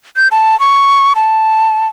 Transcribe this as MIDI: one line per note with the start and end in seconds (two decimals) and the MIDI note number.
0.16 0.28 91
0.31 0.58 81
0.60 1.13 85
1.16 1.88 81